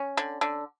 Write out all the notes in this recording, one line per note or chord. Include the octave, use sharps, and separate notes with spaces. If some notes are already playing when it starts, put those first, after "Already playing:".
Already playing: C#4
D3
D3